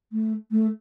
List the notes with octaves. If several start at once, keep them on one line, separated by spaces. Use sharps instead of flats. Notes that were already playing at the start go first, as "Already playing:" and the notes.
A3
A3